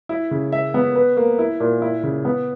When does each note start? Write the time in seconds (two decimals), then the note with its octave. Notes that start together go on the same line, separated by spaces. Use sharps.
0.09 E4
0.31 C#3
0.52 E5
0.74 B3
0.95 B4
1.17 A#3
1.39 E4
1.60 A#2
1.82 E4
2.03 C#3
2.25 B3